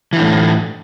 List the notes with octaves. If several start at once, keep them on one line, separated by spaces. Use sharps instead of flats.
A2 D3 E3